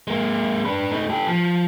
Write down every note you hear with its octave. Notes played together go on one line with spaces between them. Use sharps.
G#3 A#3
D4 B4
A3 D#4
G4 A4
F3